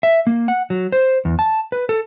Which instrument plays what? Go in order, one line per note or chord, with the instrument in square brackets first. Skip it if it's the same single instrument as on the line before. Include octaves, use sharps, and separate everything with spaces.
[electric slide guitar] E5
A#3
F#5
F#3
C5
E2
A5
B4
A4